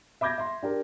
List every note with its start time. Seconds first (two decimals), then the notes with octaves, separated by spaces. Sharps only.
0.21 E5 B5 D6 G6 G#6 A#6
0.38 E5 C6
0.62 D4 G4 A#4